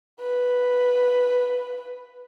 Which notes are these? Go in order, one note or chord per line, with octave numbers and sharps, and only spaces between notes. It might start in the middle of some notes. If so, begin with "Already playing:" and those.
B4